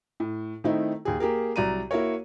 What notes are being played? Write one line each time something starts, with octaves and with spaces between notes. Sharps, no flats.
A2
D#3 A3 C4 D#4 E4
D#2 G#4
A#3 G4 G#4 A#4
C2 F#3 D5 A#5 D#7
A#3 E4 F#4 A#4 C#5